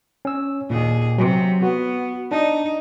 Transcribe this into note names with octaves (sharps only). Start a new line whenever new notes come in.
C#4 E6
D#2 A#2 G#4
C3 F#3
B3 F#4
D4 D#4